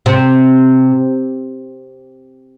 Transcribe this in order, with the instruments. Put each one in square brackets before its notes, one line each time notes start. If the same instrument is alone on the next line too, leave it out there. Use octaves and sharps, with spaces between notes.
[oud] C3